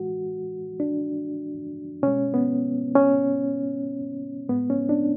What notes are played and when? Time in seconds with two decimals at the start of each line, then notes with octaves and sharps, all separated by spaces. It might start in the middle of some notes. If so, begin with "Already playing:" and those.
Already playing: A2 E3 G#3 F#4
0.80 D4
2.03 B2 G#3 C#4
2.34 B3
2.95 C#4
4.49 A2 G#3 B3
4.70 C#4
4.89 D4